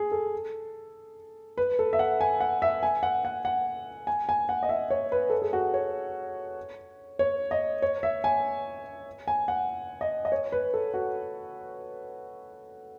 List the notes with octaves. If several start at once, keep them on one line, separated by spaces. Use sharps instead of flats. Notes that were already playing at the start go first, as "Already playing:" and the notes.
Already playing: G#4
A4
B4
A4
E5
F#5
G#5
F#5
E5
G#5
F#5
F#5
F#5
G#5
G#5
F#5
D#5
E5
C#5
B4
A4
G#4
F#4
C#5
C#5
D#5
C#5
E5
G#5
G#5
F#5
D#5
D#5
C#5
B4
A4
F#4